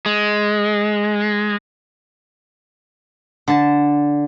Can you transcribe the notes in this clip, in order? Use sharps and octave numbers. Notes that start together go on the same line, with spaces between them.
G#3
D3 A5